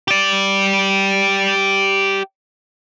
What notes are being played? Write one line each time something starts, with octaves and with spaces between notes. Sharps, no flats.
G4 D5